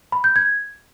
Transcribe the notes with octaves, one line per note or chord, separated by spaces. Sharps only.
B5
G6
G#6